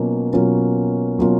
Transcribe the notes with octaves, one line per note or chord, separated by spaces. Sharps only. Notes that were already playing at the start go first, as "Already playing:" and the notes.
Already playing: B2 F#3 A#3 C#4 F4
B2 F#3 A#3 C#4 F4
B2 F#3 A#3 C#4 F4